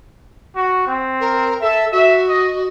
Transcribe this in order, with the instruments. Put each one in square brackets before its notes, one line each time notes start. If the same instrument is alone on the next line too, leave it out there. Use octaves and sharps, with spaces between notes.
[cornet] F#4
C4
[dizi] A#4
[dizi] A4 [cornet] E5
[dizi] F#4 [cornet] E5
[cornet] D#5